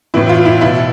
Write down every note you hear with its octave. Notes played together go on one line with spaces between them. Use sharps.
A2 E3 E4
F4
E4
B2 E4